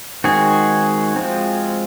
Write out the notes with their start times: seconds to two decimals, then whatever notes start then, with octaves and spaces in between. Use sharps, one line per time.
0.24 D#3 G#3 C4 F#4 G#4
1.16 F3 G#3 C4